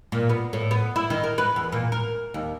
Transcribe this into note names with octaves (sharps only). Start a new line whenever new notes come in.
A#2
B3
A2
B3
E4
D#3
A#4
B4
E2
A#2
A#4
D#2